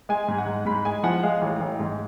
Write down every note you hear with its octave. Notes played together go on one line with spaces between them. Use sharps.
G#3 G#5
G#2
F#5
G#2
G#2 B5
G#3 G#5
F3 F#5
G#3 F5
A1
A1
G#2